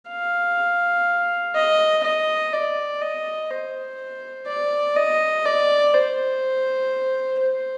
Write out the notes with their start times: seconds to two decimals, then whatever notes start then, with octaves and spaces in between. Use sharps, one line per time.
0.09 F5
1.55 D#5
2.04 D#5
2.53 D5
3.02 D#5
3.51 C5
4.47 D5
4.97 D#5
5.46 D5
5.94 C5
7.40 C5